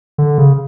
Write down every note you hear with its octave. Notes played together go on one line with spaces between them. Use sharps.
D3
C#3